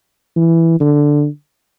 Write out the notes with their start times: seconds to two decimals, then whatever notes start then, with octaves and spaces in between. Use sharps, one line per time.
0.36 E3
0.80 D3